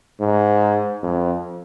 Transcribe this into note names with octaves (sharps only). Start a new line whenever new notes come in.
G#2
F2